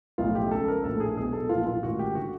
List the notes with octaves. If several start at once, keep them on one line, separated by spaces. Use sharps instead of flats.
B1 A2 F3 F4
G4
C#2 C#3 F3 A4
A#4
A#1 A2 E3 A4
G#4
B1 B2 G#4
A4
B1 A#2 F3 F4
F4
A1 G#2 D#3 F#4
G4
D3 F#4